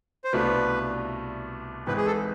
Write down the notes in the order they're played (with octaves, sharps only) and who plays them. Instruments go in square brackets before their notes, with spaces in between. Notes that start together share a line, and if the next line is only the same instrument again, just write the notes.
[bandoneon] C5
[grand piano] C2 B2 A3 D4 F4 [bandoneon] B4
[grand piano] G#1 G#2 E3 [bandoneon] B4
[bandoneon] G#4
A4